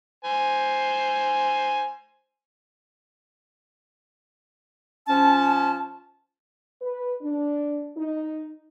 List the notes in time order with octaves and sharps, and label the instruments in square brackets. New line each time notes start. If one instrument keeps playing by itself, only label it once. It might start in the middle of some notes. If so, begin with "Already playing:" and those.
[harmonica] C5 G#5
[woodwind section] F3 C#4 A5
[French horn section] B4
D4
D#4